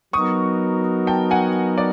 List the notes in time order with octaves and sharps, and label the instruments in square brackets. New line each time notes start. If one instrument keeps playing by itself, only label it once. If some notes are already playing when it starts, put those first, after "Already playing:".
[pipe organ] F#3 B3 D#4 F#4 A#4 [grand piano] C#6 D#6
[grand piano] G5 A5
F#5 G#5
D5